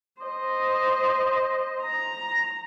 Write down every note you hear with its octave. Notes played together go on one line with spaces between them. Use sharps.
C5 D#5
A#5